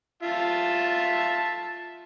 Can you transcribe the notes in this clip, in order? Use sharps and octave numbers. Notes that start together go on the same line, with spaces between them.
F4 E5 A5